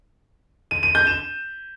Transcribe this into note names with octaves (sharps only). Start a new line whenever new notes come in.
D#7
D#7
G6
E7